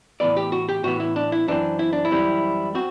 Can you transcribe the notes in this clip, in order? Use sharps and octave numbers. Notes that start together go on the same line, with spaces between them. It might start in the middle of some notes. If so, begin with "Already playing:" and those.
A2 E3 B3 D5
G4
F#4
G4
A2 E3 B3 F#4
E4
D4
E4
F#2 E3 G3 C4 D4
E4
D4
E4
F#2 E3 G3 C4
C4 F#4